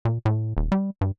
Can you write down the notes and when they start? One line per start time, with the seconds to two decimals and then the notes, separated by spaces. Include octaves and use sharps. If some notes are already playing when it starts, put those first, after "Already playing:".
0.05 A#2
0.25 A2
0.57 D#1
0.72 G3
1.01 G2